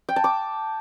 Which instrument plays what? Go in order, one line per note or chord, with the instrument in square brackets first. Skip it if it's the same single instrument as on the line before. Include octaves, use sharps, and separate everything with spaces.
[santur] G5
A5
D6